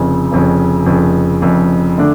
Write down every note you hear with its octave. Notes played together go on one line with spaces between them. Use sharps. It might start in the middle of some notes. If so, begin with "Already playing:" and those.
Already playing: F1 F2 C#3
F1 F2 C#3
F1 F2 C#3
F1 F2 C#3
D3 A3 D4